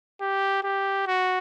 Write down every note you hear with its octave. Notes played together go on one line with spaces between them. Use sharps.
G4
G4
F#4